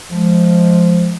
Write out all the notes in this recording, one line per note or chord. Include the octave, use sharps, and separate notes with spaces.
F3 G#3